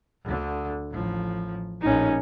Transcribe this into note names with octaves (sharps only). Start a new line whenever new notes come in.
D2 D3
A1 F3
A#1 A2 C#4 D#4